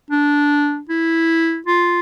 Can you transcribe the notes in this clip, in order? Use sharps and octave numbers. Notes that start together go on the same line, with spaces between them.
D4
E4
F4